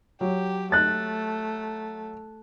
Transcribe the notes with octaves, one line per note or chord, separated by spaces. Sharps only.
F#3 G4
A3 F#6 A6